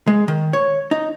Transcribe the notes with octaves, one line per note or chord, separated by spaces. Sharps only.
G#3
D#3
C#5
D#4